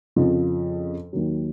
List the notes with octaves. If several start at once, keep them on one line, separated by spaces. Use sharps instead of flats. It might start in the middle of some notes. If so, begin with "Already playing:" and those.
F2 C#3 F3
D#2 D#3 F#3